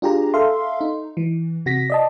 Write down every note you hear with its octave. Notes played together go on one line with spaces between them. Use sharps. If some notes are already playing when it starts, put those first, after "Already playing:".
D4 F4 G4 G#4 A#5
A4 E5 F5 C6
D#4
E3
C3 F#4 A#6 B6
D5 D#5 A5